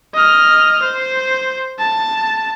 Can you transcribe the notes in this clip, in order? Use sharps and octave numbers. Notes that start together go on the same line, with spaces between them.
D#5 F6
C5
A5